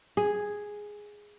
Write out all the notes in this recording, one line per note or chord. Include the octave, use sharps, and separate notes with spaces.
G#4